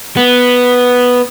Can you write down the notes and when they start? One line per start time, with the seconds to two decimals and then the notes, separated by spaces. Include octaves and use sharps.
0.17 B3